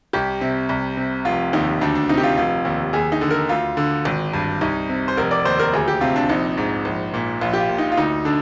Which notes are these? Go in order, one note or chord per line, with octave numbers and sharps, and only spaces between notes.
C2 G4
C3
C2
C3
F1 F4
D#2 D#4
D2 D4
D4
C3 D#4
G4
F4
F1 F4
D#2
D#2 G#4
D#4
D3
A#4
D2 F4
D3
G#1
G2
C2 D#4
C3
C5
F1 A#4
D5
D#2 C5
A#4
D2 G#4
G4
C3 F4
D4
A#1 D#4
G#2
A#1
A#2
A#1 F4
G4
F4
A#2
D#4
F4
D2 D#4
D3 D4